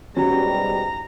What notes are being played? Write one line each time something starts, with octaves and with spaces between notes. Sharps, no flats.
G#2 B2 F#3 G3 C#4 A#5